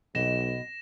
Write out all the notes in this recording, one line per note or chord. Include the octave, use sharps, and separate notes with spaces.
B1 B2 D#5 A#6 E7